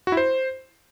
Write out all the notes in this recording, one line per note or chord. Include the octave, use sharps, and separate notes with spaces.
F#4
E4
C5